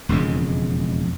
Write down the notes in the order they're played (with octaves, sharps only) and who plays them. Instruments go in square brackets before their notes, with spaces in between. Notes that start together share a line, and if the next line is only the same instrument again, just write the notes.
[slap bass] E1 F2 C#3 G#3